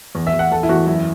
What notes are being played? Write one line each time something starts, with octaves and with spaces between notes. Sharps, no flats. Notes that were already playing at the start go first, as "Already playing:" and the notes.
E2
E5
E2
F#5
E2 A4
E4
E2 F#4
F#2 E4